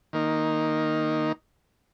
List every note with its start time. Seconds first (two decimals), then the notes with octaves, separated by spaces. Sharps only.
0.13 D#3 A#3 D#4